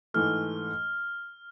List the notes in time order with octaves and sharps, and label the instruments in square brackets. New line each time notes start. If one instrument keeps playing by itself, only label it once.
[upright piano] G#2 E3 A3 [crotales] F6